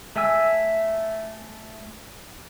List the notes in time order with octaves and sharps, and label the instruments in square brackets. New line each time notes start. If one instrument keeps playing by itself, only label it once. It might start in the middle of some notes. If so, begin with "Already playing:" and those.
[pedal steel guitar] A3 E5 G#5 E6